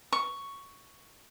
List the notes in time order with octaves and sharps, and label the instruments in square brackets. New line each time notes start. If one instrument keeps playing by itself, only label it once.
[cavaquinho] C#6